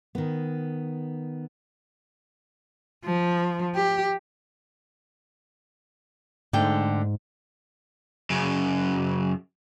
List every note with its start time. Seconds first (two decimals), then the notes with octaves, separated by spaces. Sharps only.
0.15 D#3 B3
3.04 F3
3.75 G4
6.53 G#2 D3 A3 G5
8.30 F#2 C#3